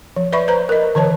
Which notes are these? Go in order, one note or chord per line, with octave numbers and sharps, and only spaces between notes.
F3
B4 D5 E5 B5 C#6
B4 C5 A#5
A#4 D#5
D3 E3 C#5 A5